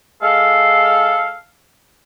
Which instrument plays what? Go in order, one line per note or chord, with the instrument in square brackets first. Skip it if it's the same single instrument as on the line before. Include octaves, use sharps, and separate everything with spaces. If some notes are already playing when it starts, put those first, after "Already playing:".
[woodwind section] G#3 A4 F5